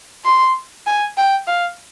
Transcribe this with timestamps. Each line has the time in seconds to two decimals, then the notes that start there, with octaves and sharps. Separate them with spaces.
0.25 C6
0.87 G#5
1.17 G5
1.47 F5